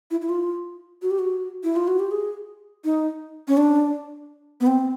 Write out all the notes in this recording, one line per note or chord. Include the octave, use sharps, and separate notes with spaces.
E4
E4
F4
F#4
G4
F#4
E4
F4
F#4
G4
G#4
D#4
C#4
D4
B3
C4